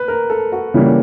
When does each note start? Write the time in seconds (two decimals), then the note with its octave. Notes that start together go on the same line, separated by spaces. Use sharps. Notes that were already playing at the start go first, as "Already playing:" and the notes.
Already playing: B4
0.08 A#4
0.30 A4
0.52 F#4
0.74 C#3 E3 G3 A#3